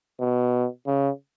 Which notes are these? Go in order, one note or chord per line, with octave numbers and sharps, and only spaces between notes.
B2
C#3